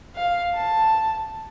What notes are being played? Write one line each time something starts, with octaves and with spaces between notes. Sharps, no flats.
F5
A5